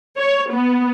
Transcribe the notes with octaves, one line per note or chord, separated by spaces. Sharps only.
C#5
B3